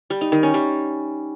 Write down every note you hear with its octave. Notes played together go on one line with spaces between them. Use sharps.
G3
D#4
D#3
C#4
G3